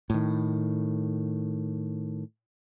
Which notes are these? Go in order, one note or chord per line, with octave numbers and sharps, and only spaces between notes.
A2 D#3